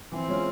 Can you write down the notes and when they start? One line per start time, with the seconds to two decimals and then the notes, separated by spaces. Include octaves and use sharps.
0.12 E3 C4
0.28 G#3 C#4 F4